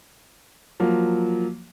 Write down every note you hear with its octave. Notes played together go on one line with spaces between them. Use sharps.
F3 F#3 A#3